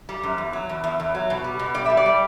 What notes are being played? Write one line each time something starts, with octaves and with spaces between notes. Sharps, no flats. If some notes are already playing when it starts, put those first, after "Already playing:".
G3
F#2
E2
F#3
E2
E2
E2
F#3
B2
G3
B2
G3 D5
G3 E5
D5
G3